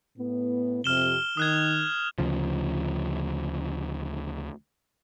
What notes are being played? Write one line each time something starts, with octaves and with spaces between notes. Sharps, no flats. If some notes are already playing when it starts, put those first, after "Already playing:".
A2 B3
F2 C3 F6 E7 G7
D#3 D#6 F#6 G#6
D2 C#3 F3